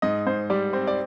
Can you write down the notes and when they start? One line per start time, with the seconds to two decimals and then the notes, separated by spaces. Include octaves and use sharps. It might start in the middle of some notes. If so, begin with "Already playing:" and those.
0.02 G#2 D#5
0.27 G#2 C5
0.50 G3 D5
0.73 C4
0.87 D5